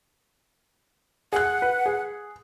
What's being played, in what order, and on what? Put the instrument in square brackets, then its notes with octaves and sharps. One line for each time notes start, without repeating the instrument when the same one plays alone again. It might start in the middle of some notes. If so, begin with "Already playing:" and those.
[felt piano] G#4 F#6 [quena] F#5
[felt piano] B4
G#4